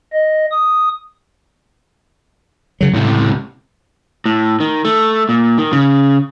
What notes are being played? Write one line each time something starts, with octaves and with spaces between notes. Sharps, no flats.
D#5
D#6
C#3 F#3
C#2 A2 C3
A2
D#3
A3
A#2
D#3
C#3